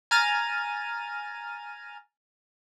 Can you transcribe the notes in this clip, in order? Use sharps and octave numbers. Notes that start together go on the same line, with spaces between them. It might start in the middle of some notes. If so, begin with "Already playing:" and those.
G#5 A#5 F6 A6 D#7